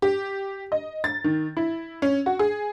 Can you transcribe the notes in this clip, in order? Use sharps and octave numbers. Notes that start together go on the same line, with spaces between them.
G4
D#5
A6
D#3
E4
C#4
F#4
G#4